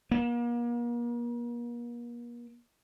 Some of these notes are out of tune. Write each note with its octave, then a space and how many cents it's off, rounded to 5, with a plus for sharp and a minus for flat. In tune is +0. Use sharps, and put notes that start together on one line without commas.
A#3 +40